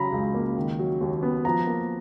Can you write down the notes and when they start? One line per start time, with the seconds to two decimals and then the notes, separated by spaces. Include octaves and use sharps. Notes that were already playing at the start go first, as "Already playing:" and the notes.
Already playing: C#3 F#3 A#5 B5
0.12 C#2
0.34 A#3
0.57 D#3
0.79 F#3
1.01 D#2
1.23 B3
1.45 F3 A#5
1.67 A#3